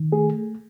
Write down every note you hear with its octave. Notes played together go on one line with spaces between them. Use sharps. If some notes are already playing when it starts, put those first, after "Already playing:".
Already playing: D#3
A3 G#4